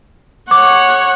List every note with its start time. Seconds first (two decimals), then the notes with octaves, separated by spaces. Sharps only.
0.51 C#5 F#5 D6